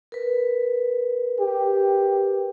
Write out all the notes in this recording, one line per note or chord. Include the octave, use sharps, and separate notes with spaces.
A#4 B4
G4